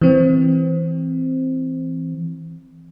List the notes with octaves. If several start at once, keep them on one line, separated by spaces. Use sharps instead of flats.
E3 C4